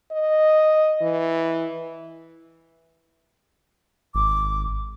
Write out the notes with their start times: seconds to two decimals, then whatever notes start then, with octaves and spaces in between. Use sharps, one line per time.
0.11 D#5
1.02 E3
4.15 G#1 D6